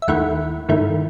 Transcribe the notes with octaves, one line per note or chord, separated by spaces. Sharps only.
E5
D#2 D#3 A3 E4 F#5
G2 D#3 A3 E4